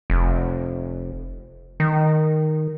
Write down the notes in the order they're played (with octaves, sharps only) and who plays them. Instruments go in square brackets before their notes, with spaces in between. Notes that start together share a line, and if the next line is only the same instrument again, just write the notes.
[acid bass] F1
D#3